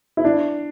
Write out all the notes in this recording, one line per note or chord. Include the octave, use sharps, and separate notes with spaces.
E4
D4